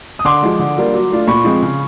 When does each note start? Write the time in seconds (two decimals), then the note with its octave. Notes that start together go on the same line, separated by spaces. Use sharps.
0.19 D#6
0.25 D3 C6 D6
0.43 F3 G#3
0.59 D3
0.77 G3 A#3 D4 F4
0.94 F#3
1.10 A3 D4 F4
1.28 A#2 B5 C#6
1.44 F3 G#3 C4
1.62 C#3